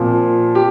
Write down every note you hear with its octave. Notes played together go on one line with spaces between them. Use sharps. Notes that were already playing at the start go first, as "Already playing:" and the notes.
Already playing: A#2 F3 C4
G4